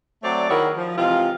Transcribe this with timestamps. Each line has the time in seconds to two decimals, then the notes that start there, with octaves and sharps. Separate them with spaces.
0.23 F#3 A3 C4 C#5 D5
0.50 D#3 E4 F#4 G#4 A#4 C#5
0.77 F3
0.98 C3 E3 G#3 F4